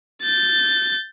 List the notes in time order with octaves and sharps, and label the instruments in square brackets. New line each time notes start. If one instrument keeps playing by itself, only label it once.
[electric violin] G6 A6